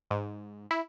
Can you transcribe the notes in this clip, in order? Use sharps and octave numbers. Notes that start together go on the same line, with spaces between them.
G#2
E4